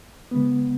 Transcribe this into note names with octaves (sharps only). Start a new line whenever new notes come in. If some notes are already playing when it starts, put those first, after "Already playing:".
C#3 G#3 B3